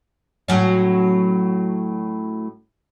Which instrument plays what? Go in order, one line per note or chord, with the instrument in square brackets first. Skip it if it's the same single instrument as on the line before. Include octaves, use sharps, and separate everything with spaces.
[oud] A2 F#3 C#4